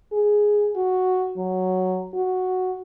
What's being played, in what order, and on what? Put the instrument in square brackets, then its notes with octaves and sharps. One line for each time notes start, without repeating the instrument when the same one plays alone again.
[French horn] G#4
F#4
F#3
F#4